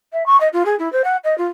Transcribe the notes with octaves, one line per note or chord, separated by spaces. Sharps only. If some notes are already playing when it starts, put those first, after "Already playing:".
E5
C#6
D#5
F4
G#4
E4
C5
F#5
D#5
F4